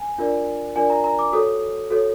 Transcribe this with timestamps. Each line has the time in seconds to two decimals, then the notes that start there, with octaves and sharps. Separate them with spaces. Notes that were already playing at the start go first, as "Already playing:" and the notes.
Already playing: G#5
0.18 D4 F4 A#4 D5
0.76 D4 F4 A#4 D5 G#5
0.90 A#5
1.04 A#5
1.19 D6
1.33 F#4 A4 C#5 D#6
1.90 F#4 A4 C#5